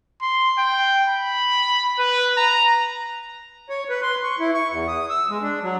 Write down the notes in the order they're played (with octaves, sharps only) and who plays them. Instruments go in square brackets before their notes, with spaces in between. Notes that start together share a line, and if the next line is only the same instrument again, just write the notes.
[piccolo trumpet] C6
G5
B5
B4
A#5
[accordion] C#5
B4
C6
C#6
E4
C#6
E2
D#6
E6
G#3
D4
F#3